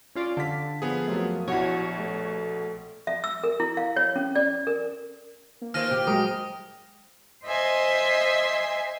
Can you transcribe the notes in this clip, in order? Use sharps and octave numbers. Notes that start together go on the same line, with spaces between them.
C#4 F4 D5
D3 F5 A5 B6
F3 B3 G#4
F2 F#3 A3 A#3
A#1 B2 E4 F#4 C#5
A3
E5
E6
A#4
E4
F5
C#5
C#4
D5
A#4
A#3
D#3 F4 C5 F6 A#6 D#7
A#2 G4
F#3 G#3 A#4 D#6
C5 D#5 E5 G#5 C6